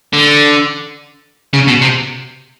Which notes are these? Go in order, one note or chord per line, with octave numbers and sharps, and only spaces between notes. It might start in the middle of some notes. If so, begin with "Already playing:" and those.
D3
C#3
B2
C3